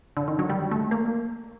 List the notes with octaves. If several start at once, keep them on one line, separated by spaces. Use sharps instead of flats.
D3
D#3
F#3
G3
A3
A#3